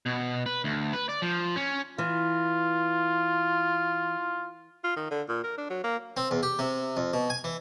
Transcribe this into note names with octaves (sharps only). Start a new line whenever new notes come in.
B2
B4
D2
B4
D5
F3
C#4
E3 F4
F4
D#3
D3
A#2
A#4
D4
F#3
A#3
C4
E2
G4
C3
F2
B2
G#5
E3